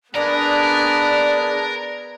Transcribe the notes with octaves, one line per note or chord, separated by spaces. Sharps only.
B3 D4 G#4 A#4 B4 D5